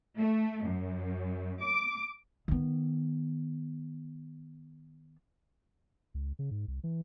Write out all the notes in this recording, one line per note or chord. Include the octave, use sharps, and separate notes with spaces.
A3
F#2
D6
D#3 B3
C#2
C#3
G#2
C2
E3